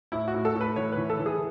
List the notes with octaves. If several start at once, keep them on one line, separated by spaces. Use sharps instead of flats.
A2 E4
F#4
A2
A4
A2
B4
E3 C#5
B4
E3
A4
E3
G#4